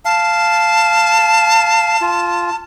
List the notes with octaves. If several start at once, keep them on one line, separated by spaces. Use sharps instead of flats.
F5 A5
F4